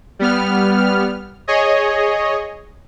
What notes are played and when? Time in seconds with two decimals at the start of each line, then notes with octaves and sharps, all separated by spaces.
0.19 G3 B3 F6
1.48 G#4 C#5 D#5